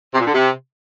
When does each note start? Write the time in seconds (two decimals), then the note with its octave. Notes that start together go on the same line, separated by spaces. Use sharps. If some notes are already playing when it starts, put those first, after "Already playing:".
0.13 C3
0.19 A#2
0.26 D3
0.32 C3